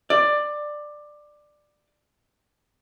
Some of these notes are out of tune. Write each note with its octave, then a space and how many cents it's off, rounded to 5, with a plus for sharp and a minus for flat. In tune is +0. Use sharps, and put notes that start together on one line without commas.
D5 +15